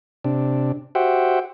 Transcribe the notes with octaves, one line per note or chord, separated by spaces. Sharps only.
C3 D4
F#4 G4 C5 E5 F#5 G5